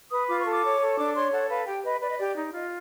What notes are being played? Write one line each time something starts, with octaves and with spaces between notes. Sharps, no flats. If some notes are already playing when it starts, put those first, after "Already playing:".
B4 D#6
F4 D6
C#6
A4 D6
C#5
A4
D4 D6
C#5 C6
A4 F#5
B4 F5
G4 G5
B4 D#5
B4 D5
D#5
G4 D5
D#4
F4 D#5